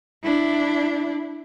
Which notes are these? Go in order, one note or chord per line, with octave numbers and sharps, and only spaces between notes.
D4 E4